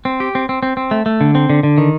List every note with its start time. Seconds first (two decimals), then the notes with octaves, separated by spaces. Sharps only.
0.05 C4
0.20 G4
0.35 C4
0.49 C4
0.63 C4
0.77 C4
0.91 A3
1.06 A3
1.21 D3
1.35 C4
1.50 D3
1.63 D3
1.78 D#3